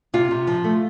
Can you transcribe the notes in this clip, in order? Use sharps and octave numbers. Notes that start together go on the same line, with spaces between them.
C3 F4
C3
F3
A3